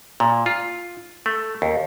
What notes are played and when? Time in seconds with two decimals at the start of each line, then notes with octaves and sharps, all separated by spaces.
0.20 A#2
0.46 F4
1.26 A3
1.62 D#2